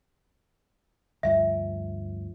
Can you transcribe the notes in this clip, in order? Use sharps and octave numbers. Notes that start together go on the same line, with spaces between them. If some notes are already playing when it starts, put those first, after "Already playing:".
D2 G2 F3 E5